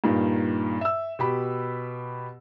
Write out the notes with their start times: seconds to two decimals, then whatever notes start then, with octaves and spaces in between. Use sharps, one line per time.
0.04 G2 A#2 D#3
0.81 E5 E6
1.19 B2 G4 B5